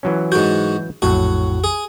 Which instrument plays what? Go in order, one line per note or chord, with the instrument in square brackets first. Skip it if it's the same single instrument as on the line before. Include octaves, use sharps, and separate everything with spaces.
[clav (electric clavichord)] E3 F#3 C#4
[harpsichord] G#2 F#4 [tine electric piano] G6
[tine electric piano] A#1 F2 [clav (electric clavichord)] A2 F#3 [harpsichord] F#4
[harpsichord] G#4